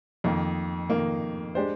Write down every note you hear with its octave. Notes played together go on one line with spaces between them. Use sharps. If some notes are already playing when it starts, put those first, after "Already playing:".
F2 D#3 A#3
F2 D#3 A#3
G#3 D4 G4 C5